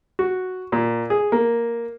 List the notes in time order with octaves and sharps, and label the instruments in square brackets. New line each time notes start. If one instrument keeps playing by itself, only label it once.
[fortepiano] F#4
A#2
G#4
A#3